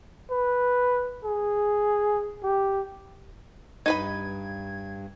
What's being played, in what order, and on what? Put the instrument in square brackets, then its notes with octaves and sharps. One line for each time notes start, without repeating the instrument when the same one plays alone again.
[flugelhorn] B4
G#4
G4
[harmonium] G2 [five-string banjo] D#4 B4 B5 [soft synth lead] G#6